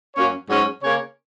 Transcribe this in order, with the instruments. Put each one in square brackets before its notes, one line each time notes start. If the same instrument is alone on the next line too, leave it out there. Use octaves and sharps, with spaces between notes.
[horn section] F#2 F#3 A#3 C#4 C#5
G#2 F#3 C#4 C#5
C#3 A#3 C#4 C#5